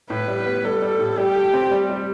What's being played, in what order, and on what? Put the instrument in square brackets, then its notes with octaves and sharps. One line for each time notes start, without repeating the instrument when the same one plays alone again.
[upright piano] A2 [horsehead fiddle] B4
[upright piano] G3
B3
[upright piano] G3 [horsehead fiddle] A4
[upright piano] G3
A2
[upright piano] G3 [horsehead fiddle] G4
[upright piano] A4
C4
G3
G3